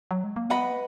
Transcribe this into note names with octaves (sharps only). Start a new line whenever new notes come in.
F#3
G#3
A#3
B3 B4 D#5 F#5 B5